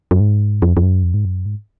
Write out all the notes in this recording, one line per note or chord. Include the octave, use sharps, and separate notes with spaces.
F#2
G#2
F2
F2
F#2
F2
G#2
F#2
G#2